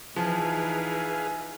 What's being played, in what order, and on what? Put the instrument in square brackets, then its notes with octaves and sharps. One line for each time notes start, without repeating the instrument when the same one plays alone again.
[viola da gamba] E3 D#4 [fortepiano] F3 [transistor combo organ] G#4 B4 F5 [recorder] G#5